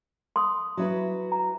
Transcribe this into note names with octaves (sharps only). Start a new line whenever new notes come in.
C6 D#6
F#3 E4 B4
A#5